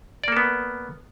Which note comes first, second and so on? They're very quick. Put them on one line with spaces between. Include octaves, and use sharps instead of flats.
D5 A#3 A4 B3